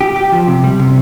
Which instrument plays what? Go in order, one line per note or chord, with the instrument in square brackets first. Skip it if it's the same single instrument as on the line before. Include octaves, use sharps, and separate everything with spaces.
[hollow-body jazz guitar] G4
G4
F3
C3
G3
C3